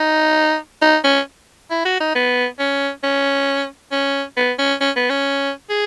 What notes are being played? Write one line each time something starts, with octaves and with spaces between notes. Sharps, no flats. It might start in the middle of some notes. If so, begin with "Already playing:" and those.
Already playing: D#4
D#4
C#4
E4
F#4
D#4
B3
C#4
C#4
C#4
B3
C#4
C#4
B3
C#4
G#4